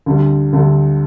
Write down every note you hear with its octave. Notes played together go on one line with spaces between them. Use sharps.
D2 D3 G3
D2 D3 G3